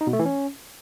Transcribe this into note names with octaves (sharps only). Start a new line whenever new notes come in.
D#4
B2
A3
E3
C#4